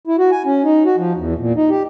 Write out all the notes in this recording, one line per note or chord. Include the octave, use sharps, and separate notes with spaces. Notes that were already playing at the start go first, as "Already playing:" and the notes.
E4
F#4
G#5
C#4
D#4
F#4
F3
E2
A#2
D#4
G4